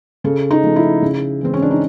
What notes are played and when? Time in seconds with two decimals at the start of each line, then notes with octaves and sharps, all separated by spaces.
0.24 C#3 A4
0.51 D#4
0.63 F3 A3
0.76 E4
1.02 C#3
1.41 E3 G#3 C4
1.54 C#4
1.62 D4
1.71 D#4